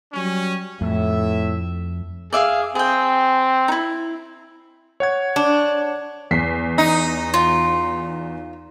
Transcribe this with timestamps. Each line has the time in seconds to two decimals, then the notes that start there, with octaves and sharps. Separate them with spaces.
0.14 F#3 G3 C#4
0.81 F2 A2 E5
2.33 G#4 D5 E5 F5
2.75 C4 G#4 G5
3.68 D#4 E4
5.00 C#5 F#5 G#6
5.36 D4
6.31 E2 B6 C7
6.78 D#4
7.34 F4